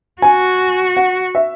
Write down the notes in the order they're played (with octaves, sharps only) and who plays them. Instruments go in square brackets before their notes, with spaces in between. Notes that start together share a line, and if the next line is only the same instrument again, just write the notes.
[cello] F#4 [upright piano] G#5
[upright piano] F#5
E5